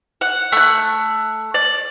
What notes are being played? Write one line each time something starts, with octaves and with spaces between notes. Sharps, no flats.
F#5
A3 F#6
D5